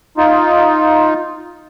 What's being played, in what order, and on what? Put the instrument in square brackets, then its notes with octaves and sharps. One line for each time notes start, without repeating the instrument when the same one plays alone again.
[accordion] D#4 F4